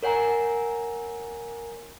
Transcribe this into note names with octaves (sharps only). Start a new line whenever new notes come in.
A#4 C#5 F#5 G#5 A#5